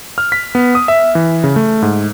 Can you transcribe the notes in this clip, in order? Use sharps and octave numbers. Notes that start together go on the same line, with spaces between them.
F6
B6
B3
D#6
E5
E3
C#3
A3
G#2